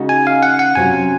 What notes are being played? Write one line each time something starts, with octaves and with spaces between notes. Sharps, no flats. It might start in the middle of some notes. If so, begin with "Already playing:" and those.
Already playing: C#3 G#3 D#4 F#4
G#5
F5
F#5
F#5
C3 F#3 C#4 F4 G#5